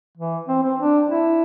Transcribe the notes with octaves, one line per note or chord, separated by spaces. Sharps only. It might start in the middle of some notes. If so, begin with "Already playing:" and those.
E3
C4
C4
D4
E4